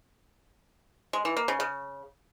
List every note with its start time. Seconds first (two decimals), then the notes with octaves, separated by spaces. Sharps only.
1.13 G#3
1.25 E3
1.37 A#3
1.48 C#3
1.60 C#3